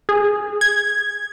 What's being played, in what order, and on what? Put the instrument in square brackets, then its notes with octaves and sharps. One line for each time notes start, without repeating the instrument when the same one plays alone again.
[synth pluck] G#4
G#6